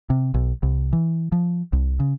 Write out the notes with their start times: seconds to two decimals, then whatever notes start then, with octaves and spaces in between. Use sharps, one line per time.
0.10 C3
0.34 B1
0.63 C2
0.93 E3
1.32 F3
1.73 C2
2.00 C#3